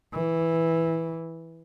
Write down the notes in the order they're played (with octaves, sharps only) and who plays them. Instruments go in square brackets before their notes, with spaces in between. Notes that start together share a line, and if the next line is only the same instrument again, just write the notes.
[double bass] E3